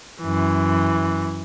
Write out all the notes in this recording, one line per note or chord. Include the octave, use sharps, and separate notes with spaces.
F#2 E3